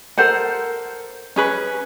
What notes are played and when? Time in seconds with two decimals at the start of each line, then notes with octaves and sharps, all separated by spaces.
0.18 A4 A#4 C5 F#5
1.36 C#4 G#4 B4